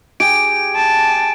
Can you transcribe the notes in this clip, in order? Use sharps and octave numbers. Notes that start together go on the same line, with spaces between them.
G4 G#4 D7
A5